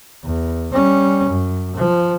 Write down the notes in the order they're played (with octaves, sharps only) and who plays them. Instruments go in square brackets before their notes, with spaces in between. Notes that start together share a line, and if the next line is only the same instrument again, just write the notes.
[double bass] E2
G3 C#4
F#2
F3